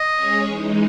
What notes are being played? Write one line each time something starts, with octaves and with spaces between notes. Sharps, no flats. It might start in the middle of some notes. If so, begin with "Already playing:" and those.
Already playing: D#5
G#3 C#4 G#4 C#5
E3 G#3 D#4